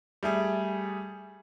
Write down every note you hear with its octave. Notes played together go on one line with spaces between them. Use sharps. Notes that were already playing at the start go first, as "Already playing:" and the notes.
G3 A3 G#4